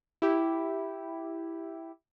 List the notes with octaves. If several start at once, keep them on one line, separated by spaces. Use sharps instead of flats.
E4 G4